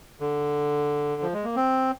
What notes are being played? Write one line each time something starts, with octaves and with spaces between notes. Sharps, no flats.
D3
F3
G#3
A#3
C4